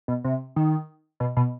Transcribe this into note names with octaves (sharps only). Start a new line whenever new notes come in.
B2
C3
D#3
B2
B2